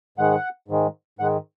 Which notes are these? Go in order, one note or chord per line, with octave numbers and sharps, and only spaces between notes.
G#2 D#3 G#3 F#5
G#2 D#3 G#3
G#2 D#3 G#3 F#5